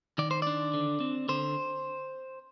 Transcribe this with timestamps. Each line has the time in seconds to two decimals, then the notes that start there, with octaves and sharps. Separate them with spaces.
0.18 D#3 D5
0.31 C5
0.42 D4 D5
0.74 D3
1.00 C4
1.29 D3 C5